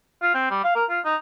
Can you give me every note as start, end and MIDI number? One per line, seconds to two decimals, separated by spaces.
0.22 0.30 65
0.35 0.50 60
0.51 0.61 55
0.64 0.73 77
0.75 0.85 70
0.90 1.00 65
1.05 1.16 63